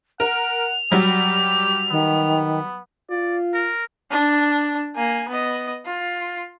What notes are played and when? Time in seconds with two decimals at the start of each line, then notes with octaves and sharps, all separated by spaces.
0.20 A#4 F#5 F7
0.92 F#3 G3 G4
1.91 D#3 B3
3.10 F4 D5
3.54 A#4
4.11 D4
4.96 A#3 G#5
5.28 B3 D#5
5.85 F4